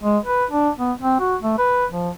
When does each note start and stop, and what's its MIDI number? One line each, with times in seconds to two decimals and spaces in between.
0.03 0.18 56
0.25 0.45 71
0.51 0.70 62
0.79 0.92 59
1.01 1.19 60
1.20 1.36 66
1.43 1.56 57
1.58 1.86 71
1.91 2.10 53